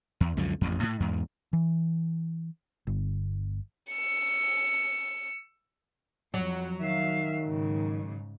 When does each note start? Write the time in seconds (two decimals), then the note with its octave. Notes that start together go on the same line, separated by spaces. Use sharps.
0.20 E2
0.37 C#2 F#2 D3 F3
0.61 A1 F2
0.83 A2
1.00 E2 G#2
1.53 E3
2.87 G1
3.92 E6 C#7
6.34 F2 F#3
6.81 D#3 E5 F5
7.43 G#2 C#3